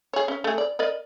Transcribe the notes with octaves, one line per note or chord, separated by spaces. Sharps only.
G#4 C#5
C#4
A3 G#4
D5
A#4 D5 D#5